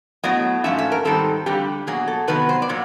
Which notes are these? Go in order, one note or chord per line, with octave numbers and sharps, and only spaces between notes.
A2 F#3 B3 D#5
G#2 F3 A3 C#4 E5
E5
A#4
G#2 D#3 G3 C4 A4
F2 D3 G3 G4
B2 F#3 A#3 G#4
A4
C3 D#3 F#3 B3 B4
C5
D5
A#2 F#3